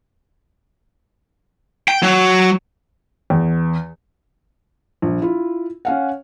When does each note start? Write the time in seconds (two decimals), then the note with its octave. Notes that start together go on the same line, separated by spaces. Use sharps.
1.88 G5
2.03 F#3
3.30 E2
5.02 A#1
5.22 E4 F4
5.85 C#4 F5 F#5